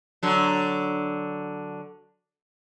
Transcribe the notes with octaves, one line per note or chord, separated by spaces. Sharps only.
D3 F#3